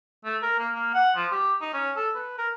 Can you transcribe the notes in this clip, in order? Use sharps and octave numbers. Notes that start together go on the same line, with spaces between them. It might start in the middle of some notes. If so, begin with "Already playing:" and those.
A3
A#4
A#3
A#3
F#5
F3
G4
D#4
C#4
A4
B4
A#4